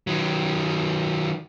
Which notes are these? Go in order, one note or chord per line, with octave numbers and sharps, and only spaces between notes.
D#3 F#3